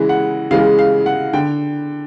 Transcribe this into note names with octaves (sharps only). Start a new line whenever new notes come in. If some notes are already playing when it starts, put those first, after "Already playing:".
Already playing: C#3 E3 G#3
F#5
C#3 E3 G#3 F5
F5
F#5
D3 G5